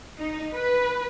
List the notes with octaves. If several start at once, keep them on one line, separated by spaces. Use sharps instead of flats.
D#4
B4